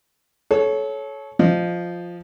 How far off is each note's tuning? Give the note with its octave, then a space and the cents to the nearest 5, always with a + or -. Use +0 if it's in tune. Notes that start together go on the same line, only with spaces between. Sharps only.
A4 -30 C#5 +0
F3 +0 D#5 -15